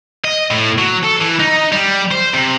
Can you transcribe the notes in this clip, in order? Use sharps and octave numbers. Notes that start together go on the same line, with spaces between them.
D#5
A2
F#3
A4
E3
D#4
G3
C5
C3